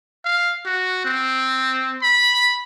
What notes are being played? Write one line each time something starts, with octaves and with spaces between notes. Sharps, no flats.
F5
F#4
C4
B5